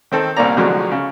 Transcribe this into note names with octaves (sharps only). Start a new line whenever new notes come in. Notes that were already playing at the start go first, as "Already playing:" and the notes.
D#3 C4 A4
C2 A#2 A#3 D5 A#5
C2 A2 D3 F3 F#3 G#3
C#3